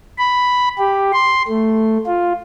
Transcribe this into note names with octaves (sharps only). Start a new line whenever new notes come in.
B5
G4
C6
A3
F4